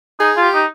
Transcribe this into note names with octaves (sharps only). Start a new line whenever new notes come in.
D#4 G#4
F4
G4
D#4